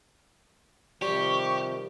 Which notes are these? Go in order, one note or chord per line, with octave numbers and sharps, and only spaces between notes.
C3 D#3 F3 G3 G4 C#6